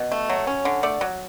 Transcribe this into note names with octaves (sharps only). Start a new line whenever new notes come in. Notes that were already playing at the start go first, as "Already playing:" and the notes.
Already playing: B2
A3
F#3
C#4
D3
A3 D5
F#3